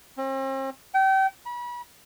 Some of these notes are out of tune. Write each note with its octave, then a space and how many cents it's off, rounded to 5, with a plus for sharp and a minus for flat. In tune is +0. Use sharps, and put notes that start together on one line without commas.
C4 +45
G5 -30
B5 -35